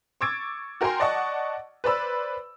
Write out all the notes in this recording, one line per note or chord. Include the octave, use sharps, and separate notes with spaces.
C#6 D6 E6 G#6 A6 D7
F#4 A#4 G5 G#5 A#5 C6
D5 D#5 F#5 A5 C#6
B4 C5 D5 B5 E6